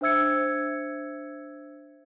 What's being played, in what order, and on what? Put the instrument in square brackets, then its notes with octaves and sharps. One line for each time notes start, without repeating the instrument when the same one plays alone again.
[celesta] D4 C5 E5 E6 G#6 C#7